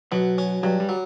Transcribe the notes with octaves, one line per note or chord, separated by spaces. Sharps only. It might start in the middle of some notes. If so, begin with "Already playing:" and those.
B2 F#3
C#4
G2 F#3
G3
F#3